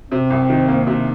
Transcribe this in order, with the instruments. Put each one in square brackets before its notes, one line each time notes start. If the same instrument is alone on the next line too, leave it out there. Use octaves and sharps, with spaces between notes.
[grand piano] C3 [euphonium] C4
[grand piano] C2
D#3
A#3
C3